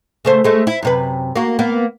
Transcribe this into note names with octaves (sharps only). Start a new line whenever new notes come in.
C#3 A3 C5
G#3 A3
E4
F#2 C3 B4
A#3 F#4
A#3 B3